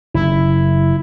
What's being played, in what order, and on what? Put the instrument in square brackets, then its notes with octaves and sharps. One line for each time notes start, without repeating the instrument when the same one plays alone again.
[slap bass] F#1 [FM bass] E4